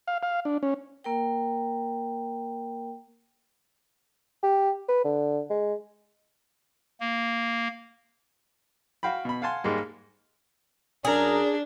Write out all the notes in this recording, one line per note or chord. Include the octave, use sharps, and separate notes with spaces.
F5
F5
D4
C#4
A#3 A#4 G5
G4
B4
D3
G#3
A#3
F#4 F5 G5 B5
B2 B5
F5 F#5 G#5 A5 C6
G#2 G3 G#3 A#3
F#2 D4 G#4 A#4 A#5